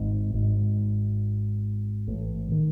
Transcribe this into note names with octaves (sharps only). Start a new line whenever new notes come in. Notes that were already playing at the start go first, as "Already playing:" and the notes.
Already playing: G#1 G#2
G#1 G#2
A1 A2
D#3